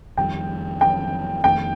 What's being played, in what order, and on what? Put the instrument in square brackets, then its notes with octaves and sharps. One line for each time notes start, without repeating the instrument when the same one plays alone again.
[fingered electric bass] F2 D#3 G3 [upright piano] G5
[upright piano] G5
[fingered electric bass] F2 D#3 A3 [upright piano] G5